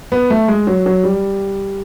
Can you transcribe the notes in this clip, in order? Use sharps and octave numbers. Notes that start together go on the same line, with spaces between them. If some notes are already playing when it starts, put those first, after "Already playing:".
B3
A3
G#3
F#3
F#3
G3